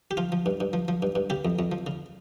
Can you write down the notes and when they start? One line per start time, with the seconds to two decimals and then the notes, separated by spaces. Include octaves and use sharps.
0.11 G4
0.17 F3 F4
0.32 F3
0.46 G2
0.60 G2
0.73 F3
0.88 F3
1.02 G2
1.15 G2
1.30 C#3 G4
1.45 F2
1.59 F2
1.72 F3
1.86 C#3